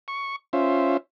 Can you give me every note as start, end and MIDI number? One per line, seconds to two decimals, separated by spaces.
0.08 0.36 85
0.53 0.97 61
0.53 0.97 65
0.53 0.97 72
0.53 0.97 76